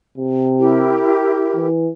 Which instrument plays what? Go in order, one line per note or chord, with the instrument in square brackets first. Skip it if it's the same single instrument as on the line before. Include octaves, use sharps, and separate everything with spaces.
[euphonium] C3
[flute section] E4 G4 A#4
[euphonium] E3